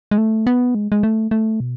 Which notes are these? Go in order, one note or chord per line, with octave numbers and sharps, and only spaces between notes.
G#3
A3
B3
G#3
G#3
A3
A3
B2